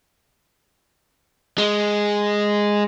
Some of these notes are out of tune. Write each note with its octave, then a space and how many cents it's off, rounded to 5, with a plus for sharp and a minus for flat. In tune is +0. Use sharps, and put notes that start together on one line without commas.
G#3 -5